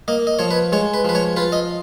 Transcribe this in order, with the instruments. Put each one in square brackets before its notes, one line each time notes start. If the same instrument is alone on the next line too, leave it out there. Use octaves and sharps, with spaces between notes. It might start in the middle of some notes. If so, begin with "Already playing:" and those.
[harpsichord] A#3 D#5
D#5
F3 C#5
B4
G#3 C#5
B4
F3 B4
C#5
F4 B4
D#5